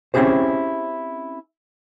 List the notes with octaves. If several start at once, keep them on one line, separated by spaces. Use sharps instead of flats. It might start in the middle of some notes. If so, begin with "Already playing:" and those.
C4 C#4 E4 G4 G#4 C5